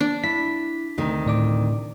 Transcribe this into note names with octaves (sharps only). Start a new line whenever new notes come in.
D4
E4 B6
D2 C3 D#3
A2 D5 D6